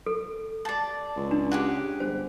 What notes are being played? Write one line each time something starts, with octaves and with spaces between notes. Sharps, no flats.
A4
D5 A5
C#2
D4
G4 G#4 F#5
G1 C5